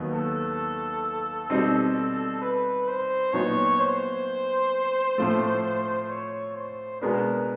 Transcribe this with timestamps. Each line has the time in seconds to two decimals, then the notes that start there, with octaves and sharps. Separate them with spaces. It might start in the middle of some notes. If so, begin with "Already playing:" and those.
Already playing: D#2 D#3 F#3 B3
0.12 A4
1.50 B2 G3 C4 D#4
2.41 B4
2.88 C5
3.33 A#2 F#3 B3 D#4 C#5
3.80 C5
5.18 A2 F3 A3
6.10 C#5
6.55 C5
7.01 B2 G#3 B3 D4 A#4